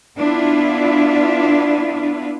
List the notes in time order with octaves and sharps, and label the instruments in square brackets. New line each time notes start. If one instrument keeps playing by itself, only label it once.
[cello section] B3 D4 E4 F4